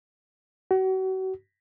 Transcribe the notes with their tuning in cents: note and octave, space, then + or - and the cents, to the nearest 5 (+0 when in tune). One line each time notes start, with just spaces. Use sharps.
F#4 +35